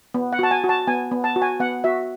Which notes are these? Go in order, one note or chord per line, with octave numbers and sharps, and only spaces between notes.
B3
F#5
F#4 A5
G#5
F#4
A5
B3 G#5
B3
A5
F#4
G#5
B3 F#5
F#4 E5